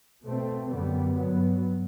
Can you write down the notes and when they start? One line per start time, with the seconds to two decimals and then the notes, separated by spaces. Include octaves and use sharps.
0.24 B2 A3 C4
0.70 F#2 D3 G3 B3
1.15 G2 F#3 B3